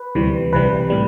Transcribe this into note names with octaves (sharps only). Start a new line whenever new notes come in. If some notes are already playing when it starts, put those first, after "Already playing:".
Already playing: B4
D2 C3 E3 G3
C2 C3 E3 G3 B4
A2 G3